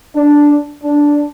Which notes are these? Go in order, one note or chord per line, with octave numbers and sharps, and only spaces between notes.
D4
D4